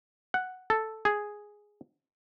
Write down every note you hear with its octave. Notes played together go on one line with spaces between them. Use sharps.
F#5
A4
G#4